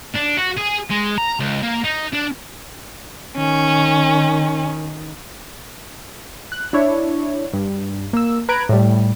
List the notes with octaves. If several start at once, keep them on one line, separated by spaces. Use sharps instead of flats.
D4
F#4
G#4
G#3
A#5
C#2
A#3
D#4
D4
D#3 C#4
F#6
D4 E4 C#5
G2
A#3 E6
B4 A#5 F#6 G#6 D7
A2 G3